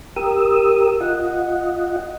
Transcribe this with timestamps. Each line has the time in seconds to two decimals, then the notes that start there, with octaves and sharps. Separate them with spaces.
0.16 G4 A#4 D#6 E6
1.00 F4 D#5 F#5